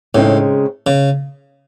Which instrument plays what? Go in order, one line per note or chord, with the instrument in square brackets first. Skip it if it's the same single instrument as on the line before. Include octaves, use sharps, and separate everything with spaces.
[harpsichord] A2 [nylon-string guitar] C#3 G#3 C4 D#4
[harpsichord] C#3